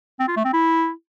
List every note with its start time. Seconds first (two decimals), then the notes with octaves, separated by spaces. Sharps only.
0.19 C4
0.28 F4
0.36 A3
0.45 C4
0.53 E4